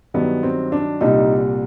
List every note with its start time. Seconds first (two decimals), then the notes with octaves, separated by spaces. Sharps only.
0.14 G2 D#3 F#3 B3
0.43 C4
0.72 D4
1.01 C2 A#2 G3 D#4